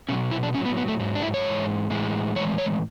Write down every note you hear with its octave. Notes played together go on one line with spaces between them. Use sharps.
B2 F#3 C#4
E4
D4
A2 F#3 C#4
B3
B3
A3
G#2 F#3
D4
E4
C#5
G#2 E3 G#3
A2 E3 G#3
A2 E3 G#3 C#5
C#5